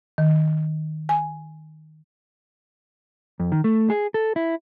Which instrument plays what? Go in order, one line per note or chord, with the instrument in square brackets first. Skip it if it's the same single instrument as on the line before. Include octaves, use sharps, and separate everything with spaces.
[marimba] D#3
G#5
[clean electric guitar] F2
D#3
A3
G#4
A4
E4